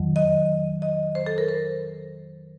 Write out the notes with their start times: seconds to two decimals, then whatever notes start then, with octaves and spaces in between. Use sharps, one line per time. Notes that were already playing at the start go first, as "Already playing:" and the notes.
Already playing: F2 D#3 F#3
0.16 D#5
0.82 D#5
1.15 C5
1.26 A4
1.38 A#4
1.48 C5